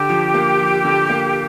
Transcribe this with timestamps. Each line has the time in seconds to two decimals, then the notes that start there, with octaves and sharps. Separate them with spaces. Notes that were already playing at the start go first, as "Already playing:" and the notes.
Already playing: D3 G4
0.09 F3
0.34 A#3
0.60 F3
0.85 D3
1.09 A#3